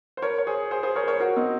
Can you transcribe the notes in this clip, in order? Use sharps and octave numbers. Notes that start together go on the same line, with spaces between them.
C5
A#4 C#5
C#5
G#4 C5
G#4 C5
G#4 C5
A#4 C#5
A#4 C#5
F#4 A#4
C4 D#4